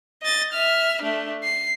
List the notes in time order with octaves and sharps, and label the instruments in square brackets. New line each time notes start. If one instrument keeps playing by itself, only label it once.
[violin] D#5 A6
E5 F6
A3 D4
C7